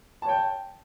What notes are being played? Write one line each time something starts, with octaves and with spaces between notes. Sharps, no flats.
C#5 G5 A5